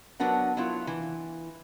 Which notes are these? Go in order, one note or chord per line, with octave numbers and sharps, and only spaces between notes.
F#3 B3 D4 A#4 F#5
F#3 B3 E4 F4
E3